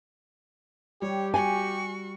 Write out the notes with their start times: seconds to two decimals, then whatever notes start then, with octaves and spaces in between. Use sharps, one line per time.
1.02 G3 G4 C#5
1.34 F#4 G#5 C#6